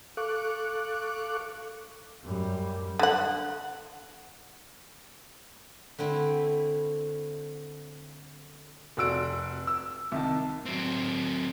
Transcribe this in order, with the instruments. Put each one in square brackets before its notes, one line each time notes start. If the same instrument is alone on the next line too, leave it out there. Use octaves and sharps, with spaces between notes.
[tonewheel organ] A4 F5 C#6 D6 F#6
[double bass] F#2 G3
[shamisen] D3 F#5
[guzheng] D3 A3 C4 E4
[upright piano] F1 C4 F#4 E6 D7
E6
C2 D#3 A5
[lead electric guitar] F#3 C4